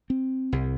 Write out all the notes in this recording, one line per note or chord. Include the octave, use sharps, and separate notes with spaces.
C4
C2